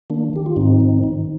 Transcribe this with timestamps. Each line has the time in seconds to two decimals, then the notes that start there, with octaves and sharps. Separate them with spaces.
0.10 D#3 A#3 D4
0.33 D#3 G4
0.46 F4
0.56 G#2 C4 D#4
0.80 D#3
1.03 D#3